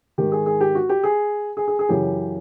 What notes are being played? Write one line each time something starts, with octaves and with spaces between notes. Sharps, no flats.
G#2 D#3 G4
G#4
G#4
G4
F#4
G4
G#4
G#4
G#4
G#4
F#2 C#3 E3 G4